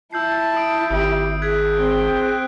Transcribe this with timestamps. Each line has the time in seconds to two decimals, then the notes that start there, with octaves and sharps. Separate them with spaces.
0.13 E4 A5 E6 G6 C7
0.56 D#6 C7 D7
0.91 G#1 G4 D#6 D7
1.42 G#4 F#6 G#6 B6
1.77 C4 G5
2.16 F#6